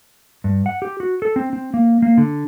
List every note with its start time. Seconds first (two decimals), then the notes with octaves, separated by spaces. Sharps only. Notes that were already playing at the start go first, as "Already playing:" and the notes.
0.44 G2
0.66 F#5
0.82 G4
1.00 F#4
1.22 A4
1.36 C4
1.53 C4
1.74 A#3
2.02 A#3
2.18 D3